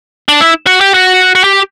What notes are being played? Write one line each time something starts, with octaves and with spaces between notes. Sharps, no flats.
D4
E4
F#4
G4
F#4
F#4
G4